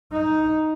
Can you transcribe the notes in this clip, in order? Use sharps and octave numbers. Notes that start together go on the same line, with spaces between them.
D#4